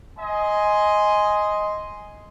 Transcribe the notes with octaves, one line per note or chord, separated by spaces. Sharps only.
D#5 G#5 C6